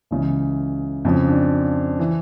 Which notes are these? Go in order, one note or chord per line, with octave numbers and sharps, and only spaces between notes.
C#2 C#3 E3
F2 C#3 F3
D4
E3